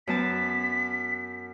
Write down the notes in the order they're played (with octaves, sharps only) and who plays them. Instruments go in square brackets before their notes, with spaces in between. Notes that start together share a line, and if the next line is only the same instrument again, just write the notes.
[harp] F#2 B3 A5 [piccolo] B6